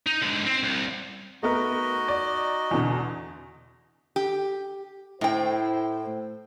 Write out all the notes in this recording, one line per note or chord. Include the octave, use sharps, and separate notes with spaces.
D#4
G#2 D3
C4
C2
A3 B3 D#4 F#4 A#4 D#5
D5
E2 B2 D3
G4
A2 E4 C5 G5